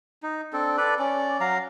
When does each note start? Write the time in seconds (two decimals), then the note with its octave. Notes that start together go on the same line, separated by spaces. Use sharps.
0.23 D#4
0.53 C4 D4 A4
0.78 A4 B4 D5
0.99 C#4 D5
1.41 F#3 F5 A#5